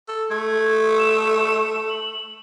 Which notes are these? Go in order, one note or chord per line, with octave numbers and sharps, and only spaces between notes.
A4
A3 G#6
E7
F#7